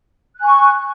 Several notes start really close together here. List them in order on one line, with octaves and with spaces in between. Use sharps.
F#6 G#5 C#6